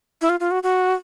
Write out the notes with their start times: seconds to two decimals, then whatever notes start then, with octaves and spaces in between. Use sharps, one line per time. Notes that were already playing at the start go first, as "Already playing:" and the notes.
0.21 E4
0.29 F4
0.40 F4
0.51 F#4
0.63 F#4